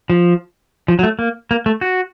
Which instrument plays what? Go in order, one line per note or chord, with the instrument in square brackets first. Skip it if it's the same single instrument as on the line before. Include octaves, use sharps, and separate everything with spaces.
[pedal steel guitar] F3
F3
F#3
A3
A#3
A#3
A3
F#4